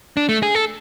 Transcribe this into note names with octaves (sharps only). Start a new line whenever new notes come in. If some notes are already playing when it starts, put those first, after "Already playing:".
D4
A3
G#4
A4